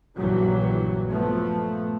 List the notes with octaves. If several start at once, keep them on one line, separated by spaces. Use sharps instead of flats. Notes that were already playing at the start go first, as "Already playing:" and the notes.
A#1 G2 C#3 E3 F#3
A#2 F3 A3 B3